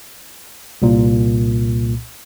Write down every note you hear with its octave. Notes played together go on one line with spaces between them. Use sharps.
C2 A#2